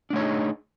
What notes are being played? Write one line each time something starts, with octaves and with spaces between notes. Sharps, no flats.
A3 D4 D#4 G#4 C#5